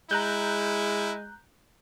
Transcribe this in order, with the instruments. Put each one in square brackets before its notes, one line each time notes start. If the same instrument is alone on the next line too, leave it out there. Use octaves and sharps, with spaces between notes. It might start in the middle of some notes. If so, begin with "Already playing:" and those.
[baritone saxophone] G#3 [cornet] E4 [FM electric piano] A#5 F#6 G6